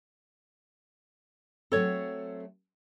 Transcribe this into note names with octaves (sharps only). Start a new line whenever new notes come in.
F#3 A3 C4 A4 C#5